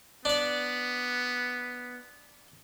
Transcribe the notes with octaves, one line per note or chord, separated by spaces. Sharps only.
B3 D4 D5